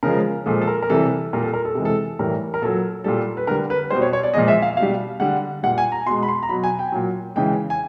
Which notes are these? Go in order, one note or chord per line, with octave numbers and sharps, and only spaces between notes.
C#3 F3 G#3 A#4
A#2 F3 G#3 A4
A4
A#4
A#4
C3 E3 G3 A4
A#2 G3 A#4
A4
A#4
A4
C3 E3 G#3
A4
A2 E3 G3 A#4
A#4
A#2 F#3 A4
A#2 G3 A4
B4
D3 G3 A#4
B4
B2 G3 C5
C#5
C#5
D5
A#2 F3 G#3 D#5
E5
F5
B2 F5
G3
D3 G3 F#5
A#2 G3 F#5
G#5
A#5
B2 G#3 C6
B5
C6
A#5
B2 F#3 B5
G#5
G5
A#2 F#3
C#3 E3 G#3 G5
G#5